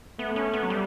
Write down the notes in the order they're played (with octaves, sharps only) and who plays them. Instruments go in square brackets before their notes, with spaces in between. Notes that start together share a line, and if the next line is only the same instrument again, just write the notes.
[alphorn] A3 [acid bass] B3
[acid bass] C#4
B3
F#3
G3